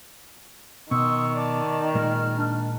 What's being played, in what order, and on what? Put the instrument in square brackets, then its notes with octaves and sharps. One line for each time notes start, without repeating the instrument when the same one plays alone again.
[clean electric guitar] B2 [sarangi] D#3 [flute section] C6 D#6 E6 [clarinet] C#6
[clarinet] D5 [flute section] A5 D6
[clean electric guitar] A#2 G#3 A#4 [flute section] F6
[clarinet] D4